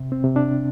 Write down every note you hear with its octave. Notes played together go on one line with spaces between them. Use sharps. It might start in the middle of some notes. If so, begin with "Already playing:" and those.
Already playing: C3
C4
C3
D4